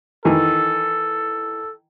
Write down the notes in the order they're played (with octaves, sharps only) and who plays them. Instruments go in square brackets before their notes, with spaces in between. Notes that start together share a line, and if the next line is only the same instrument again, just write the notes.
[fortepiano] D#3 E3 [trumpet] A4